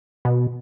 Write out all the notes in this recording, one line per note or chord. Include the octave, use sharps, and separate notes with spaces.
B2